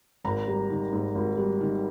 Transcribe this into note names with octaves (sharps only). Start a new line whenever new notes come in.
G#1 A#5
G3
D#3
G#2
G#1
G3
D#3